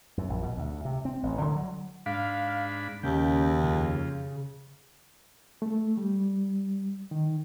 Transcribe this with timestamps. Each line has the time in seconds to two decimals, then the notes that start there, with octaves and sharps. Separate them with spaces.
0.17 F#2
0.30 A#1
0.43 B2
0.57 D2
0.85 C3
1.05 C4
1.23 A1
1.41 D3
1.56 F#3
2.06 G#2 D4 F5 B5
3.03 D#2 C#3 G4
3.63 F2 C#3
5.62 A3
5.97 G3
7.11 D#3